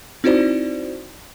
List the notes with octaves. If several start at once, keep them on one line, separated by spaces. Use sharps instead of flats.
C4 D#4 E4 F#4 C5 D5